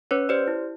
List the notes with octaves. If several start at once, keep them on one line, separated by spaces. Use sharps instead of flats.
C#4 B4 C#5
G4 C5 D5
E4